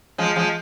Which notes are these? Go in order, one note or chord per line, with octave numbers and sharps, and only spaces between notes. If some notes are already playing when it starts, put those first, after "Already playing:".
F3 G#3
F3 G#3